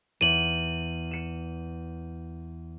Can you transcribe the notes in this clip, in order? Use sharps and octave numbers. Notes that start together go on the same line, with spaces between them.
E2 D#7 F#7
C#7 E7